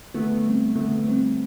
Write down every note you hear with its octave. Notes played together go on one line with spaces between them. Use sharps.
D3 A3 B3
G3 C4
D3 A3 B3
G3 C4